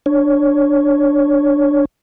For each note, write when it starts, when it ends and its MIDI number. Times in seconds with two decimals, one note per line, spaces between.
0.06 1.85 62
0.06 1.85 73